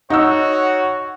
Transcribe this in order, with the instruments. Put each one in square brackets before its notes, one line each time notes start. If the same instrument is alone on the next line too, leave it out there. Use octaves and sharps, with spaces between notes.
[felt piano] D#4 F#5 E6 [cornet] F#4 [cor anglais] C#5